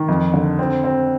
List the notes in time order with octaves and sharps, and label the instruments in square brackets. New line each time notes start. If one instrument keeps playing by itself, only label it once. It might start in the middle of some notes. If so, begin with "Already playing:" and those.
Already playing: [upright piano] D#3
F2
D3
C4
C4